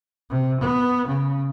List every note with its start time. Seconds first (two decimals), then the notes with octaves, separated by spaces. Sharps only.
0.30 C3
0.61 B3
1.07 C#3